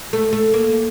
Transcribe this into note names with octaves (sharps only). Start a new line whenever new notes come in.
A3
A3
A#3